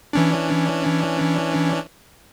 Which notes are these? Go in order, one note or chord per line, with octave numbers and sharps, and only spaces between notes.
E3 C#4 D4